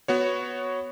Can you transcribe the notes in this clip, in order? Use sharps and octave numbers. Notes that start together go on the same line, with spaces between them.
B3 F#4 C#5